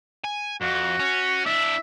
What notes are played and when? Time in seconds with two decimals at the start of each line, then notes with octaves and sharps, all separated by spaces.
0.24 G#5
0.62 F2 F#4
0.99 C#4
1.46 D4 E4 E5